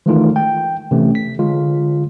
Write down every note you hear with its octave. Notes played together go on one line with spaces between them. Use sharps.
D#3 E3 G#3 A3 D#4 F4
G5
C3 E3 A3 C#4
B6
D3 G#3 F4